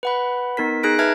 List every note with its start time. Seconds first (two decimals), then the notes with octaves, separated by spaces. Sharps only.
0.03 B4 F#5 B5
0.57 B3 D#4 A#4 B6
0.83 D#4 G#4 F#6 A#6 D7
0.99 B4 E5 A5 F6 F#6 G#6